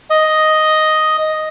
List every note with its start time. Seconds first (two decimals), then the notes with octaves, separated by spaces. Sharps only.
0.10 D#5